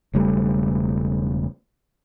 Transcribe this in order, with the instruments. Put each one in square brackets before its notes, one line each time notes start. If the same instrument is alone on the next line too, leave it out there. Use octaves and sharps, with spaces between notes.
[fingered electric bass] E1 C#3 G3 A3